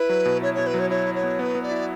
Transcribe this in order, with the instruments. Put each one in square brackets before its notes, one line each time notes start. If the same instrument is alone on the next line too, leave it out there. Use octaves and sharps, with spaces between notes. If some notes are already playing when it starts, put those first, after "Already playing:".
Already playing: [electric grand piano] E4 [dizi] B4
[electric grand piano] F#3
B2
[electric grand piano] E4 [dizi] C#5
[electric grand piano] B2 [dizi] C#5
[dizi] B4
[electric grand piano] F#3 [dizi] C#5
[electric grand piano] E4 [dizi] C#5
[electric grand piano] E4
[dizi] C#5
[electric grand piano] B3
[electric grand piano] B3 [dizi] B4
[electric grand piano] B3
[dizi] D5
[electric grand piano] E4